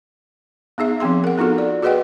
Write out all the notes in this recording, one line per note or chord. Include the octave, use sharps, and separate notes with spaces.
B3 D#4 G#4 E5
F3 B3 C4 G#4 C6
A#4 F#5
B3 D#4 F4 F#4 A4
D5
F#4 G#4 B4 D#5 F#5 G5